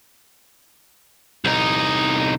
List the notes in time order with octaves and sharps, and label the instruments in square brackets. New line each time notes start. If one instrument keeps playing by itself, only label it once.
[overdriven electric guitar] C2 D#4